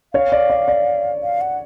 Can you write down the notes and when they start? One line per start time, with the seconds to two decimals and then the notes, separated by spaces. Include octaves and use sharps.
0.14 C#5 F5
0.32 D5
0.50 D5
0.68 D5
1.23 F5
1.41 F#5